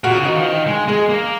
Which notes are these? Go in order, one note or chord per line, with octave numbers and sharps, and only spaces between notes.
A#2 F#4
C#3
D#3
F3
D#3
G#3
G#3 G#4
A#3